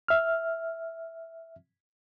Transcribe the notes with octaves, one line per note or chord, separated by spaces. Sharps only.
E5 F6